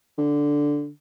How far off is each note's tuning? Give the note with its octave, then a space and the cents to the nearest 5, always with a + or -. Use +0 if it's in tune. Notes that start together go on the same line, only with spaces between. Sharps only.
D3 -5